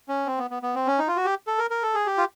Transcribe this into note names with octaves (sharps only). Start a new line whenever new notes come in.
C#4
C4
B3
B3
B3
C4
C#4
D#4
F4
F#4
G4
A4
A#4
A#4
A4
G#4
G4
F4